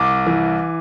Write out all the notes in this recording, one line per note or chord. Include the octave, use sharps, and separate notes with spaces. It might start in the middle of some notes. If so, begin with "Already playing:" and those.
Already playing: C2 D6
E3